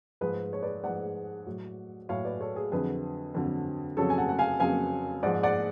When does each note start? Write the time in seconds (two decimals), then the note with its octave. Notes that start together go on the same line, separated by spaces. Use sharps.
0.21 G#2 F3 G#4 B4
0.53 C#5
0.62 B4 D5
0.83 G#2 F3 D5 F#5
1.47 A2 F#3
2.09 A2 F#3 C#5 F5
2.25 B4 D5
2.40 A4 C#5
2.56 G#4
2.72 F2 D3 F#3 G#4 B4
3.34 F2 D3 F#3
3.97 F2 C#3 F#3 A4 C#5
4.10 G#5
4.18 F#5 A5
4.29 F#5
4.39 F5 G#5
4.60 F2 C#3 F#3 F5 G#5
5.23 G#2 F3 D5 F#5
5.43 D5 F#5